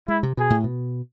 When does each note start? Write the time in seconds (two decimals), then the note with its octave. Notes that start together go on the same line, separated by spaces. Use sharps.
0.08 G#3 E4
0.23 C3
0.37 B2 G#4
0.50 A2
0.64 B2